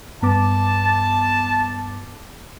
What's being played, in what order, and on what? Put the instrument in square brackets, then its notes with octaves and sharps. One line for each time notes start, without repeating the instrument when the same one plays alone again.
[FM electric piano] G2 B3 D6 [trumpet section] A5